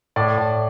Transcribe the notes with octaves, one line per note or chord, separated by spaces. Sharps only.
A2 D5
A2